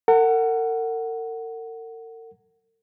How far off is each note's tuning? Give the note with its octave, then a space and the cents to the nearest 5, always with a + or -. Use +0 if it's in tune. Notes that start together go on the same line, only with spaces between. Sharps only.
A#4 -45 F#5 +10